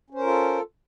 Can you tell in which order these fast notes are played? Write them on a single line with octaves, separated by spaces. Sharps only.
C#4 C5 A#4 F4 A4